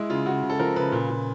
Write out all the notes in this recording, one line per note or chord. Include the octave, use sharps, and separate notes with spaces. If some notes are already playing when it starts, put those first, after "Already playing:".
Already playing: G#3 E4
C#3 F4
C#3 F#4
C#3
A4
F3 A#4
C#3 B4
A#2
A#2